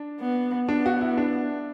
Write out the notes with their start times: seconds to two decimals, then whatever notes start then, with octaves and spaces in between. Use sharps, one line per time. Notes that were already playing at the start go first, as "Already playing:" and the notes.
Already playing: D4
0.21 B3
0.69 B3 D4
0.86 F#4
1.01 E4
1.17 D4